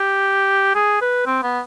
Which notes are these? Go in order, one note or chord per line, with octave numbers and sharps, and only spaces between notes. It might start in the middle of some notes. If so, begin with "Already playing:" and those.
Already playing: G4
G#4
B4
C4
B3